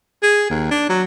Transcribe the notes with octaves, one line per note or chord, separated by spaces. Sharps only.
G#4
D#2
D4
F#3